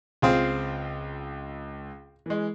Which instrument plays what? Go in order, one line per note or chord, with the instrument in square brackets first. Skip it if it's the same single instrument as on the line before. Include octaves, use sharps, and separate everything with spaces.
[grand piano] C#2 [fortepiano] C4 F4 G#4
[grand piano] E3 G#3